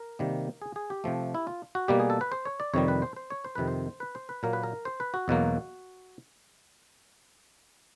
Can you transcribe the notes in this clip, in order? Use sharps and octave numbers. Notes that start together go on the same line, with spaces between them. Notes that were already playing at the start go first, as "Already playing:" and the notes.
Already playing: A#4
C3 D#3 G3 A#3
G#4
G#4
G4
C3 F3 A3
E4
F4
F#4
B2 G3 A#3 G4
G#4
A4
B4
C5
C#5
D5
F2 C3 D#3 G3 C#5
B4
C5
C5
C#5
C5
F2 C3 D#3 B4
C5
B4
C5
B4
A#2 F#3 A#3 A#4
B4
A#4
C5
B4
F#4
E2 B2 F#3 A#3